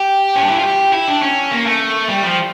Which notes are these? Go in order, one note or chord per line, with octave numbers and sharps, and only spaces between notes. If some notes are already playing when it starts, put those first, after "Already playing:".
Already playing: G4
C#4
D4
E4
F4
G4
E4
D4
C#4
A#3
A3
G3
F3